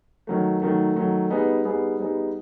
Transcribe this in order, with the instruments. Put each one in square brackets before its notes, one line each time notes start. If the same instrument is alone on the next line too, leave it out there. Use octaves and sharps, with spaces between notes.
[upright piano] D#3 F#3 A3
D#3 F#3 A3
D#3 F#3 A3
G3 B3 D#4 G#4
G3 B3 D#4 G#4
G3 B3 D#4 G#4